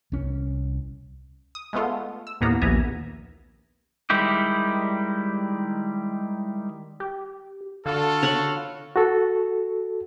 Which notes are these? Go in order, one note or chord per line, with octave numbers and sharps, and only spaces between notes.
C2 C#4
D#6
G#3 A3 B3 F4 A4
E6
D#2 A2 A#3 B3 A#5
A#1 D#2 B3 E5 G#5 A#5
D#3 G3 G#3 E4 G4
G4
D3 F4 F#4 A4 F5
C#5 F#5 B5
F#4 A4